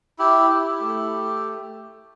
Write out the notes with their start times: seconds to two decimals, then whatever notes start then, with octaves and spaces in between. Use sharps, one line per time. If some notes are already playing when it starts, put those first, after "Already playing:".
0.19 E4 G4
0.50 E4
0.80 A3